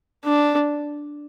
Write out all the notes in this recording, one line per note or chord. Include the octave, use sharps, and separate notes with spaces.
D4